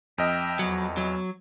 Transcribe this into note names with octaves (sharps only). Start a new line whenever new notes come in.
F2 D#5 E5 G5 F6
E2 F#3
F#3